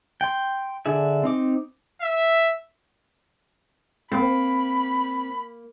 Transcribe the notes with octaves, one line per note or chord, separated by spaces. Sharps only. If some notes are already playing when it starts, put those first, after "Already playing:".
G5 C6
D3 D4 G#4 E5
C4 D#4 D6
E5
A#3 C4 B5